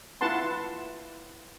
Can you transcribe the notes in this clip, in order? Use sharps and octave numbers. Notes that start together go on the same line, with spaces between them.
E4 F4 B4 F#5 A5 C6